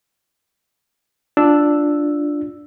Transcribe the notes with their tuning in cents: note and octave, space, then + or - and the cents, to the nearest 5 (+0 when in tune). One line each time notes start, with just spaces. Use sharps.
D4 +0 F4 +0 E6 +0